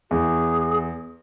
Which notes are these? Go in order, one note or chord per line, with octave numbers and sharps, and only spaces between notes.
E2 G#4